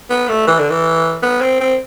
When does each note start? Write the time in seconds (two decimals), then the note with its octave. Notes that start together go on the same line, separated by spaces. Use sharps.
0.10 B3
0.28 A3
0.47 E3
0.59 D3
0.70 E3
1.23 B3
1.41 C4
1.60 C4